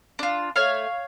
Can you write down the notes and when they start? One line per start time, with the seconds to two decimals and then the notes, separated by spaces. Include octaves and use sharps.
0.19 D4 F4
0.56 A3 C#5 F5